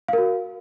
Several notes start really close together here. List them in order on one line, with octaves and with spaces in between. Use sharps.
F5 A#4 F#4